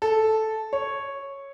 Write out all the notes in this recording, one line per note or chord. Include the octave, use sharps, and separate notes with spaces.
A4
C#5